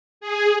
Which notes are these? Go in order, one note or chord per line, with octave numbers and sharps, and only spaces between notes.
G#4